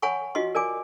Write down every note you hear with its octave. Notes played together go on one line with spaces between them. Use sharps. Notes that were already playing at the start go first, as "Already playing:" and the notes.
C#5 F#5 G#5 B5 C#6
F4 F#4 D#5 C6
A#4 D5 G#5 D6